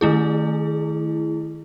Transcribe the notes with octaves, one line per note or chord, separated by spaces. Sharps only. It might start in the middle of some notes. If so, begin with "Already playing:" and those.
D#3 A3 E4 G#4